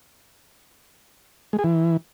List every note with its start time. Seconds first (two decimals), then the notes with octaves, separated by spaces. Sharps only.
1.53 G#3
1.59 G#4
1.64 E3